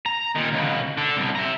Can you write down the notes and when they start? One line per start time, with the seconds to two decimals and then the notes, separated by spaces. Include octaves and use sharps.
0.06 A#5
0.36 A#2 D#3
0.53 C#2 B2
0.98 D4 A4
1.17 C2 B2
1.35 E5 A#5